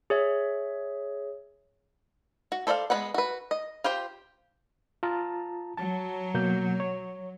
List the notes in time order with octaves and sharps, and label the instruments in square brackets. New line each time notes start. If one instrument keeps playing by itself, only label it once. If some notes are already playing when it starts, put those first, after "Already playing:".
[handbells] G#4 C#5 E5
[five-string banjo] F#4
A4 C5 D5 D#5 F5
G#3 B3 C#4 B4 F#5
F#4 B4
D#5
F4 G4 C5 G5
[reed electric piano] F4 A5 A#5
[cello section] F#3 [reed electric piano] A5
[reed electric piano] B2 A#3 G6
C#5